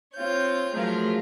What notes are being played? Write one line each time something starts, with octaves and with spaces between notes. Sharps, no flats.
C4 F4 C#5 G6
F3 F#3 A3 F4 G#4 A#4